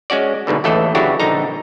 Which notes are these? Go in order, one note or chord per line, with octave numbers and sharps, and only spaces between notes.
G#3 C#4 F#4 D5
D2 G#2 B2 D3
A1 D#2 E3 A3 A4 D#5
C#3 F#3 D4 E4 F#4 G4
A#1 G2 D3 D#4 A#5